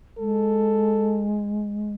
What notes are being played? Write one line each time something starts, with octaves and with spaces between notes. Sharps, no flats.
G#3 A4